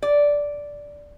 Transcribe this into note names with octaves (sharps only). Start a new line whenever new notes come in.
D5